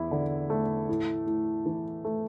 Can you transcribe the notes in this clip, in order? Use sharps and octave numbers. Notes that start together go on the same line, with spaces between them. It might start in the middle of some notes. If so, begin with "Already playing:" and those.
Already playing: E2 E4
D3
A3
A2
A2
E3
A3